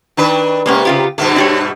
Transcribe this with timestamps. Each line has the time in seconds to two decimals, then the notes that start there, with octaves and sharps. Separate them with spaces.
0.17 D#3 D4 B4
0.66 C3 G#3 A#3 B3 C#4
0.85 C#3 F4 G4
1.18 G2 B2 D#3 A3
1.36 D4 G4 C#5